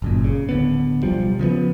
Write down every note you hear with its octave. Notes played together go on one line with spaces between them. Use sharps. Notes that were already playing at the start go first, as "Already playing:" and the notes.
G1 F#2 A#2
C#3
D1 D3 B3
B1 F3 G3
C#3 F3 F#3 B3